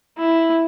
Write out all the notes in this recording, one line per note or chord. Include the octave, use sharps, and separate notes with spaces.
E4